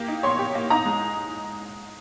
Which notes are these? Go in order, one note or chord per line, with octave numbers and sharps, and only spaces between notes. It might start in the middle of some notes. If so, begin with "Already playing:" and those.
Already playing: A#3 G4
D#4
C#5 C6
G4
A#3
D#4 A#5
G#3